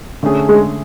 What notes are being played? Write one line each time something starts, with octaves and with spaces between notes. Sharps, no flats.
D3 A3 C#4 G#4
G#3